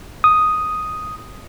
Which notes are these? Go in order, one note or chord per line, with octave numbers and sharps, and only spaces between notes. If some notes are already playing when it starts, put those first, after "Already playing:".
D#6